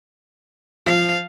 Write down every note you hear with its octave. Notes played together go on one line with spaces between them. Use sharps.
F3 F5